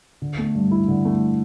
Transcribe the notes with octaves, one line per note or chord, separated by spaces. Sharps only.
D3
A3
G2
E4
D3
A3